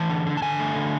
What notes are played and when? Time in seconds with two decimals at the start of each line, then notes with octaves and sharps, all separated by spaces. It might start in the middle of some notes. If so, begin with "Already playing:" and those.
Already playing: E3 A5
0.09 D3
0.26 D3
0.37 A5
0.42 D3 G#5
0.59 A3
0.76 D3